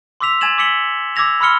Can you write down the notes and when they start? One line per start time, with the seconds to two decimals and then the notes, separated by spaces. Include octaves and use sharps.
0.20 C6 D6 E6 B6 F7
0.41 G#5 G#6 A6 E7 F#7
0.58 D6 E6 B6 C#7 F#7 G7
1.16 D6 E6 G#6 A#6 F7
1.41 B5 C6 E6 F6 C#7 G7